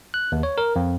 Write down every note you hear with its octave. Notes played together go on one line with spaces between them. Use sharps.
F#6
D#2
C#5
A#4
F2